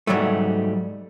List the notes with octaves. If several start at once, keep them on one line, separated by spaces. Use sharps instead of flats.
G#2 D#3 F#3 G3 A3